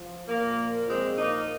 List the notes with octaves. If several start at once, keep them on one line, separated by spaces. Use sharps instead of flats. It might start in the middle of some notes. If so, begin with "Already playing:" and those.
Already playing: F3
A#2 F3 A#3
A#2 F3 G#3 C4
A#3 D#4